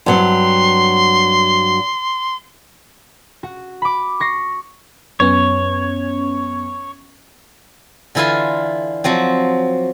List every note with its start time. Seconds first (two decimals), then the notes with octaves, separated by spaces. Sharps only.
0.06 G2 F#3 C4 C6
3.43 F#4
3.82 B5 D6
4.20 C#6 A#6 C7
5.20 F#2 B3 C#4 C#5
8.15 D3 E3 E4 F4 G#5 C6
9.04 F3 F#3 C4